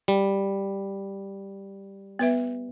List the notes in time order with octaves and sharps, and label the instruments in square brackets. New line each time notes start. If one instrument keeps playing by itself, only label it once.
[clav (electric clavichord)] G3
[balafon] B3 B4 E5